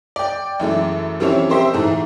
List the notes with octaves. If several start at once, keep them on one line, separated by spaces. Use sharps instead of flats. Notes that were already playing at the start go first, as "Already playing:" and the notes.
D5 G5
F#2 E3 G#3 A3
E3 F3 G3 C4 C#4 C#5
C4 G4 C5 D#5 E5
G#2 E3 A3